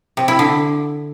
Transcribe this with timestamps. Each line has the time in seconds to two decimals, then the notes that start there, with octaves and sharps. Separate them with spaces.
0.17 C3
0.28 E4
0.39 D3